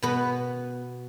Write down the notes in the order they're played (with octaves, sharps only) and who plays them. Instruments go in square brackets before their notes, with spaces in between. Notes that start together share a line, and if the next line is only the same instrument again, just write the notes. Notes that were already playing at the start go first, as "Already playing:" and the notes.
[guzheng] B2 B3 B4